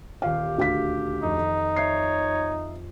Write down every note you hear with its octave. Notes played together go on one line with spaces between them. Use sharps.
D#1 F4 G4 F5
D2 F5 B6
F2 D#4
C#5 E5 B6 C7